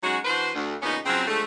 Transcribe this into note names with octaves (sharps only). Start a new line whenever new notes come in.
F#3 G#3 C#4 D#4 F#4
E3 D4 F#4 B4 C5
D2
E2 A#2 C#3 B3 C#4 D#4
C#3 F3 F#3 C4
D3 F3 G#3 A3